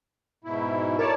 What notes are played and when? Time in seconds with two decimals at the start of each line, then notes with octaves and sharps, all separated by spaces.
0.44 G#2 B2 E4
0.99 A#4 C#5 D5 A5